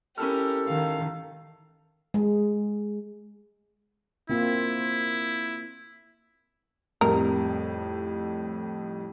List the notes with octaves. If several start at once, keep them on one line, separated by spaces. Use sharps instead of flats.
C#4 E4 G4 A4 A#4 F6
D#3 F5
G#3
A#3 C4 E4 F4
F2 A2 G3 A#4